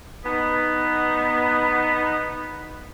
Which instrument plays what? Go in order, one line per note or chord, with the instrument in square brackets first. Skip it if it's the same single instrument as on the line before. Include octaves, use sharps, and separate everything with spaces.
[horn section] B3 D#4